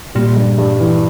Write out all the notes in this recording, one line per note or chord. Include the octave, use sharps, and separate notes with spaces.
A#2 G3
G2
G2
E3